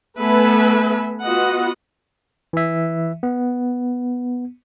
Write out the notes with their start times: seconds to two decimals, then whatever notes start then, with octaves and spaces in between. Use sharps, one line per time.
0.20 A3 B3 A4 B4 E5 G#5
1.24 B3 F4 F#4 D#5 F#5
2.53 E3 E5
3.23 B3